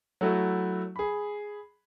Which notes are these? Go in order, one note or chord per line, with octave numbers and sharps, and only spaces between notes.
F#3 A3 E4 F#4
G#4 B5